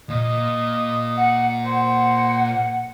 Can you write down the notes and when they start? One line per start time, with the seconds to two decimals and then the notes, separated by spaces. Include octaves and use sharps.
0.10 A#2 D#5
1.17 F#5
1.65 C5 F#5